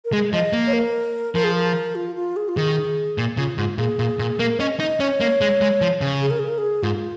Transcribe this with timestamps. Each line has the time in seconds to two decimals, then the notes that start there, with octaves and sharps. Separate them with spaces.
0.05 A#4
0.13 G#3 G#4
0.33 F3 D#5
0.53 A#3
0.67 C#5
0.73 A#4
1.34 F3 A#4
1.44 G#4
1.54 A#4
1.95 F4
2.16 F4
2.36 G#4
2.49 F4
2.57 D#3 G#4
3.18 A#2
3.37 C#3 F4
3.58 G#2 F4
3.78 A#2 G#4
3.99 A#2
4.19 A#2
4.39 A#3 A#4
4.59 C#4 D#5
4.80 D#4 D#5
5.00 C#4 C#5
5.20 A#3
5.41 G#3
5.61 G#3
5.81 F3
6.01 C#3
6.22 G#4
6.30 A#4
6.39 G#4
6.49 A#4
6.58 G#4
6.83 G#2 F4